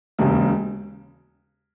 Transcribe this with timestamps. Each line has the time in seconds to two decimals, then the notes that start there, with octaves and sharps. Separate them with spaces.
0.19 E1 D#2 C#3